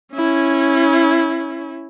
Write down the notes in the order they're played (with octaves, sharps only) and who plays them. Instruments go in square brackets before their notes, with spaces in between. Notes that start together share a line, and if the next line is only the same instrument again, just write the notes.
[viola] C#4 E4